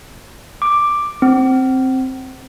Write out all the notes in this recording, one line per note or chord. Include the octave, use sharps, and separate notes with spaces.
D6
C4